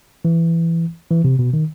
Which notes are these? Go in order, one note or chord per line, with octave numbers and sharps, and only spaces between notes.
E3
E3
C3
B2
D#3